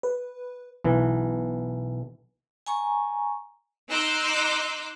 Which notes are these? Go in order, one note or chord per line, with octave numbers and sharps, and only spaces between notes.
B4
B1 E3
G#5 A#5 C#6
D#4 C6 D6 E6 F#6 G6